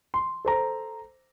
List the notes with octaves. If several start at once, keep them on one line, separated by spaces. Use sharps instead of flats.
C6
A4 C5 A#5